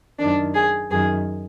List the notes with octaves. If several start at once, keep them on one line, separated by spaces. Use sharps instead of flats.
F#2 D#3 D4
G#4
F#2 D#3 G#4